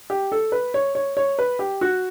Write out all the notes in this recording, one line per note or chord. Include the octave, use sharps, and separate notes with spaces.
G4
A4
B4
C#5
C#5
C#5
B4
G4
F#4